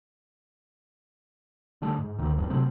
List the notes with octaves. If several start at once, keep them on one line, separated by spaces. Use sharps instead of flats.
D3 G3 A3 D4
G#2
D2 D#3
D1 A1 G2
C3 F#3 A3 C4